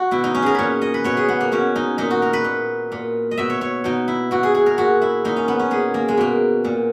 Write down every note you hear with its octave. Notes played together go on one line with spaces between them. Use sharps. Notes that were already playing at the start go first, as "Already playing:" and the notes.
Already playing: F#4
B2 E4
D#4
C#4
G#4 A#4
A#2 B4 C#5
D#5
B4
B2 C#5
G#4
B3
A#3
B2 C#4
D#4
A#2 D#4
F#4
A#4
B4
A#2
A#2
D#5
B2 E5
C#5
C#5
B2 D#4
E4
B2 F#4
G#4
G#4
A#4
A#2 F#4
E4
A#2 D#4
C#4
B3
C#4
A#2 G#4
A#3
G#3
B2 A#3
A#2